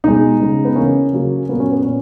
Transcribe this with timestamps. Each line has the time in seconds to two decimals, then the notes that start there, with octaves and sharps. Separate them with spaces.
0.04 B2 G#3 D#4
0.40 C#3 G#3
0.65 B3
0.76 C#3 E3 A#3 C#4
1.13 C#3 F#3 A#3
1.49 A#2 F#3 A#3 B3
1.60 C#4
1.71 B3
1.83 A#2 C#4